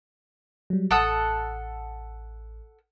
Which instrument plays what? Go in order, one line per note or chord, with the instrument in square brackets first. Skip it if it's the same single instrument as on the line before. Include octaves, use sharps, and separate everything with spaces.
[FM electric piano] F#3 G3
[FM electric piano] A1 [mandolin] A4 F#5 D#6